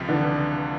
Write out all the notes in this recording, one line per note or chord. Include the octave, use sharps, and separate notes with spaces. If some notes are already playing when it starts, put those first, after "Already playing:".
Already playing: C#2 C3 F3
D3 E3